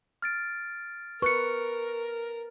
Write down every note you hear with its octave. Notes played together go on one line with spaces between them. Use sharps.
F6 A6 D7
A#4 B4 C#6 F#6 C#7